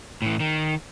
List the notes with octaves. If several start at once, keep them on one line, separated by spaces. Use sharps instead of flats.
A2 E3
D#3